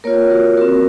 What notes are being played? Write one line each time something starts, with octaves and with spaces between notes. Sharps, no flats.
A#3 F4 A#4 C#5
F#4 A#4
C4 F#4 A#4